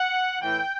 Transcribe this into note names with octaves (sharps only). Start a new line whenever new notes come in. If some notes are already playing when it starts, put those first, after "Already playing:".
Already playing: F#5
A2 E3 G5